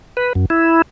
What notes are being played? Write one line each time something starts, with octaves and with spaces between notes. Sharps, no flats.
B4
F#2
E4